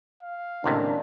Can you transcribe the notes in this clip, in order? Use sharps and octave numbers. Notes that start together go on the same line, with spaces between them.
F5
C#2 A2 C3 D#3 A#3 C#4 D4